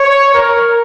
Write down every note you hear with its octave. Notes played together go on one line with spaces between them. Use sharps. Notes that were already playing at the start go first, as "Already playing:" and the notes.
Already playing: C#5
A#4